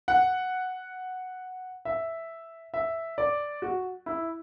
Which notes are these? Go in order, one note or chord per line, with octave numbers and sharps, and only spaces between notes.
F#5
E5
E5
D5
F#4
E4